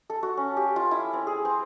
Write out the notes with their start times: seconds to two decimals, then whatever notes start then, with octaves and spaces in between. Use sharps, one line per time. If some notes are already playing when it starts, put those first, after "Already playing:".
0.10 A4
0.23 F#4
0.37 C#4
0.57 G4
0.76 F4
0.91 E4
1.13 C4
1.27 G#4
1.45 C4